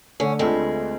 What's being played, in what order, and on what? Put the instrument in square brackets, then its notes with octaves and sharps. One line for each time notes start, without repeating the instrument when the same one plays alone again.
[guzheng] D3 [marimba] A3 [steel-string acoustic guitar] C#4
[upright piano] D2 A3 [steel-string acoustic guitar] G#3 [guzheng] C4 B4 [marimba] F4 A5